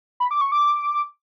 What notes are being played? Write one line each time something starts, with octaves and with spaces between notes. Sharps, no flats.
B5
D6
C#6
D6